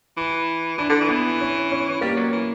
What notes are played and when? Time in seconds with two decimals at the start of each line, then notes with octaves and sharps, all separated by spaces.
0.17 E3
0.78 E3 D4
0.90 D3
1.01 E3
1.09 B3
1.41 C#4
1.72 C#4
2.01 G3 A#3
2.17 F#3
2.33 E3